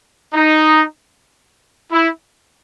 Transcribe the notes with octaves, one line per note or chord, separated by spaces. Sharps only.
D#4
E4